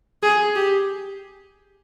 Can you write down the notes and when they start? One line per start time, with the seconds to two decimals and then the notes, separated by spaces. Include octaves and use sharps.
0.23 G#4
0.56 G4